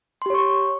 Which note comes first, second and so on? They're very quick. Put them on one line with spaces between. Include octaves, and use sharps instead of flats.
C6 G4 C#5 C#6